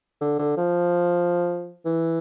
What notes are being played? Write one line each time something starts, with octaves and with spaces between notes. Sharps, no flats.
D3
D3
F3
E3